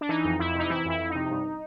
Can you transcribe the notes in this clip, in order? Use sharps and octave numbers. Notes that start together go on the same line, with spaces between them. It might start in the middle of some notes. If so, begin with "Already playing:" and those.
D4
E3 D#4
F2
F2 E4
C3 D#4
E3 E4
F2 E4
F2
D#4
C3
G2